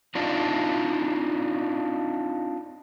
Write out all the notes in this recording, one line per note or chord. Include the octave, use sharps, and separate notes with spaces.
C4 D4 D#4 F4